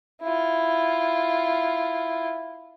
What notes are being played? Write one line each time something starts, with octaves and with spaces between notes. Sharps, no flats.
E4 F4